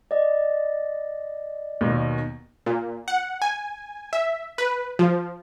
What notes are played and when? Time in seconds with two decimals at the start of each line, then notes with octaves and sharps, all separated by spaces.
0.11 D5 D#5
1.81 D#2 B2 D#3
2.66 A#2
3.08 F#5
3.42 G#5
4.13 E5
4.58 B4
4.99 F3